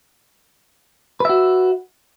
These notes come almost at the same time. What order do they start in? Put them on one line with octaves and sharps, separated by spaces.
B4 E5 F#4